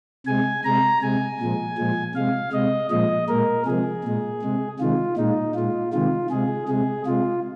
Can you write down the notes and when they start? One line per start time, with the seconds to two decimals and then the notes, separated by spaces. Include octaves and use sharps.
0.27 C3 G#3 G#5
0.64 C3 G#3 A#5
1.02 C3 G#3 G#5
1.40 A#2 F3 G#3
1.78 A#2 F3 G#3
2.15 C3 G#3 F5
2.53 C3 G#3 D#5
2.91 A#2 F3 G#3 D#5
3.29 A#2 G#3 A#4
3.66 C3 F3 G#3 G#4
4.04 A#2 G#3
4.42 C3 G#3
4.80 C3 D#3 G#3 F4
5.17 A#2 G#3 D#4
5.55 A#2 G#3 F4
5.93 C3 D#3 G#3 F4
6.30 C3 G#3 G#4
6.68 C3 G#3 G#4
7.06 C3 G#3 F4